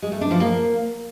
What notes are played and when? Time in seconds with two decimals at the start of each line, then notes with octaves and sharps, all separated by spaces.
0.02 G#3
0.12 A3
0.21 D4
0.31 F3
0.40 A#3